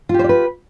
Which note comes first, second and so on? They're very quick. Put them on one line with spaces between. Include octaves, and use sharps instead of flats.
F4 G4 C5 D5 B4